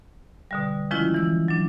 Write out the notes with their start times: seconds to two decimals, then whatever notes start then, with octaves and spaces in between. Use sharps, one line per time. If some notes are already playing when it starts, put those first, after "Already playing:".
0.51 B2 D3 G3
0.91 D#3 F3 G#3 C#4 E4 F4
1.14 E3 E6
1.48 F#3 D4